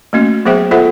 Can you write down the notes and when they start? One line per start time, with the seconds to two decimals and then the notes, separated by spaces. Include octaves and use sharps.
0.13 A3 A#3 C#4 F#4
0.45 F#3 B3 G#4 C5 E5 G5
0.71 F4 A4 C5 E5 F#5